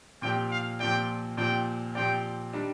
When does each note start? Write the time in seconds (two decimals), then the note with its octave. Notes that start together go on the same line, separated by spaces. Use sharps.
0.22 A#2 F3 C4 G4 D5 G5
0.51 F5
0.80 A#2 F3 C4 G4 D5 G5
1.37 A#2 F3 C4 G4 D5 G5
1.95 A#2 F3 C4 G4 D5 G5
2.53 D#3 G3 D4